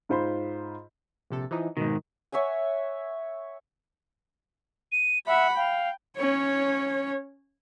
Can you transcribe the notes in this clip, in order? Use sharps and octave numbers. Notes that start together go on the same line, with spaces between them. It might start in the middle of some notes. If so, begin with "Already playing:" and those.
G#2 F4 C5 B5 C6
A#1 C3 A4
E3 F3 D#4
G#2 B2 D#3
C#5 E5 F#5 G#5
D#7
E5 F#5 B5
F5 G5
C#4 C#5